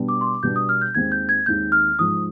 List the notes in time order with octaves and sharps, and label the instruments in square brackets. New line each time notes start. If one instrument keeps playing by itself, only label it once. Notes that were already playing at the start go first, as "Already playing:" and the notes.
Already playing: [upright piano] B2 G3 B3 D4
[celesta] D6
C6
D6
[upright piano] B2 G3 B3 D4 [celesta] G6
[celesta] D#6
F6
G6
[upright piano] D#2 D#3 G#3 C4 [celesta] G#6
[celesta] G6
G#6
[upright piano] D#2 D#3 G#3 C4 [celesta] G6
[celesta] F6
[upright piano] G#2 F3 G#3 [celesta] D#6